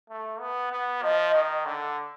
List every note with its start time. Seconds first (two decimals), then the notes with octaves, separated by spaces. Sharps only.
0.10 A3
0.40 B3
0.72 B3
1.03 F3 D#5
1.34 D#3
1.65 D3